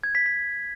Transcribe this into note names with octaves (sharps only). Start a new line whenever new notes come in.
G#6
B6
B6